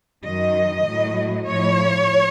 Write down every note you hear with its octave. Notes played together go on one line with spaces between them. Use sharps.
F#2 D#3 F#3 D#5
A2 F#3
A2 F3 C#5